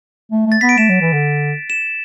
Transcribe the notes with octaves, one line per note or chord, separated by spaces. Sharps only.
A3
A3
A6
B3 B6
D7
A3 E7
F#3
E3
D3
E7